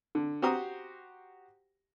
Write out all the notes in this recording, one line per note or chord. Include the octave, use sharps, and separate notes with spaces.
D3
F#4 G4 C5 A#5 D#6